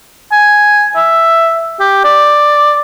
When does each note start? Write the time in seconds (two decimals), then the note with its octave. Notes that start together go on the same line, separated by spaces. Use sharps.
0.32 G#5
0.96 E5
1.80 G4
2.04 D5